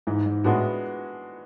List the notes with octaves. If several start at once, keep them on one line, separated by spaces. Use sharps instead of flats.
G#2 E3
G#2
A2 G#3 B3 D4 F#4